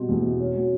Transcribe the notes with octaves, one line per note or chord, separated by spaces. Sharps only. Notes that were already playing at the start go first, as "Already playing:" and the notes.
Already playing: B2 G3 C4
E2
B2
C#4
F#3